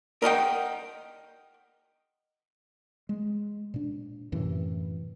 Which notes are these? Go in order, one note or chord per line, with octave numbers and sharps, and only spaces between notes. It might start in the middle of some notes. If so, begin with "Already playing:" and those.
A#4 D#5 F#5 G5
G#3
A#2 D4
F#2 A2 C3 E3